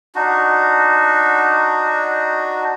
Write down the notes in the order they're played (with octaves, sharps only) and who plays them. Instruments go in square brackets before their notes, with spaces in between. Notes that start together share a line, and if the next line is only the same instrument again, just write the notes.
[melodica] D4 D#4 F#4